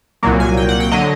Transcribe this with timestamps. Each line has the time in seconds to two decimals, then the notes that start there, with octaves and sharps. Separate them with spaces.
0.23 C2 A#2 F#3 A#3
0.40 G#5
0.57 G5
0.69 F#5
0.80 G5
0.91 D3 F#3 D#5